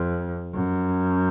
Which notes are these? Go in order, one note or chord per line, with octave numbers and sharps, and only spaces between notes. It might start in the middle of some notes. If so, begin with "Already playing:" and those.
Already playing: F2
F#2